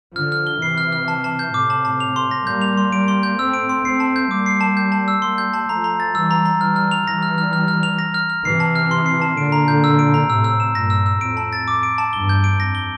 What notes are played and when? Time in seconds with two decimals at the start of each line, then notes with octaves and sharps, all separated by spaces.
0.16 D3 F3 F6
0.32 F6
0.47 G7
0.62 C3 E3 C7
0.78 F6
0.92 F6
1.08 A5
1.24 A5
1.39 G6
1.54 A2 C3 D6
1.70 A5
1.85 A5
2.00 F7
2.16 C6
2.31 A#6
2.46 G3 A#3 G6
2.62 F7
2.77 C6
2.92 G3 A#3 D7
3.08 C6
3.23 G6
3.38 A3 C4 E6
3.54 D7
3.69 C6
3.84 A3 C4 C7
4.00 A5
4.16 G6
4.31 G3 A#3 D6
4.46 C7
4.61 A5
4.77 G6
4.92 A5
5.08 E6
5.22 G3 A#3 C6
5.38 G6
5.54 A5
5.69 F3 A3 A#5
5.84 A#5
6.00 A6
6.15 E3 G3 E6
6.31 A#5
6.45 A#5
6.61 E3 G3 F6
6.76 F6
6.91 F7
7.06 E3 G3 A#6
7.23 F6
7.38 F6
7.53 F6
7.68 F6
7.83 F7
7.99 A#6
8.14 F6
8.30 F6
8.44 C3 E3 C7
8.60 A5
8.76 F6
8.91 C6
9.06 C7
9.22 A5
9.37 A#2 D3 D7
9.52 A#5
9.68 G6
9.84 E6
9.99 D7
10.14 A#5
10.30 A2 C3 E6
10.44 E6
10.60 E7
10.75 G2 A#2 A#6
10.90 E6
11.06 E6
11.21 F2 A2 D7
11.37 A5
11.53 A6
11.68 D6
11.83 D7
11.98 A5
12.13 E2 G2 G7
12.29 G6
12.44 D7
12.59 F2 A#6
12.75 G7